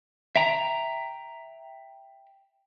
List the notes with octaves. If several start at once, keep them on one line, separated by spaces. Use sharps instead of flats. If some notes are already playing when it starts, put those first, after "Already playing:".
E5 G5 A#5